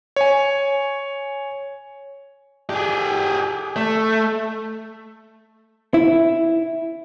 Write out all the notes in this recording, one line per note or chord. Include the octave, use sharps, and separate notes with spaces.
C#5 G#5
G4 G#4
A3
E4